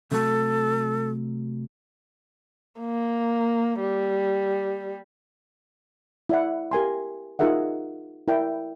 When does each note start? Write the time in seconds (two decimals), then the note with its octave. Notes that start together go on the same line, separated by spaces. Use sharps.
0.11 C3 F#3 A3 A4
2.80 A#3
3.80 G3
6.29 E4 D5 F#5
6.71 G4 A#4 G#5 C6
7.39 D#4 F4 G#4 A#4 E5 F#5
8.28 E4 A#4 D5 G5